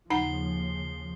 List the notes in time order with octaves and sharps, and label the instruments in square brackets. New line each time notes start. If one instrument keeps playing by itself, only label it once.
[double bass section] D#2 C#3 F3 [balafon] D#4 F#5 A#5 [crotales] C7 G7